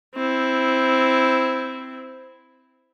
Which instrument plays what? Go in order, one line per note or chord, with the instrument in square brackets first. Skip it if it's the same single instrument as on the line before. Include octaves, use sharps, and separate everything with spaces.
[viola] C4 E4